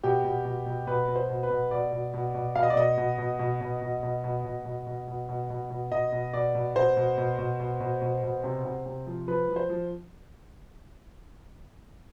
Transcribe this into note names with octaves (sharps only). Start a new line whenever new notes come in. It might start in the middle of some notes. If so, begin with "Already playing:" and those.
B2 G4
B2
B2
B2
B2 B4
B2
C5
B2
B4
B2
B2 D5
B2
B2
B2
B2 F5
D#5
D5
B2 D#5
B2
B2
B2
B2
B2
B2
B2
B2
B2
B2
B2
B2
B2
B2
B2 D#5
B2
B2 D5
B2
B2 C5
B2
B2
B2
B2
B2
B2
B2
C3
C3
C3
F3
F3 B4
F3
C5
F3